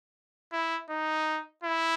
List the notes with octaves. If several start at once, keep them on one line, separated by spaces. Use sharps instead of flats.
E4
D#4
E4